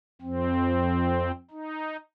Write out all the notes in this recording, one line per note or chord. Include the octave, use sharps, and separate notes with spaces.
F2 C4
D#4